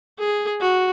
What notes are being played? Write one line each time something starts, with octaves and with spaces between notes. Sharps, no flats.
G#4
F#4